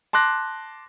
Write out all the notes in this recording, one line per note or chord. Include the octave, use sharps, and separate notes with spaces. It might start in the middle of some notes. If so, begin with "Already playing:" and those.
A5 C6 D6 F#6 A#6